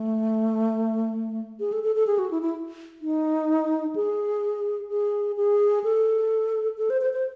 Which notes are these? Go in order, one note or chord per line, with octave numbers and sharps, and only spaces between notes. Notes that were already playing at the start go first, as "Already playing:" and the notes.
Already playing: A3
G#4
A4
A4
A4
G#4
F#4
E4
E4
D#4
G#4
G#4
G#4
A4
A4
C5
C5
C5